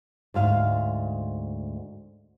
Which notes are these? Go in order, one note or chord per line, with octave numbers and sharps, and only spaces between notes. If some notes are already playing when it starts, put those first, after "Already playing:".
D2 G#2 F5